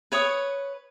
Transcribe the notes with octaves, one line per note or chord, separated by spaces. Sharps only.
B4 C#5 C#6 D#6